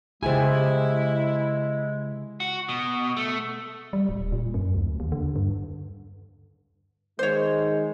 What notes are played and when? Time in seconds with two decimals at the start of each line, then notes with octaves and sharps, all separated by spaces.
0.23 C#3 G#3 E4 G4 G#4 C5 G#5
2.40 F#4
2.69 B2
3.17 A3
3.93 G3
4.09 D#1
4.32 A#2
4.54 F#2
4.75 D2
5.00 D#2
5.12 D3
5.36 G2
7.19 D#3 G#3 C5 C#5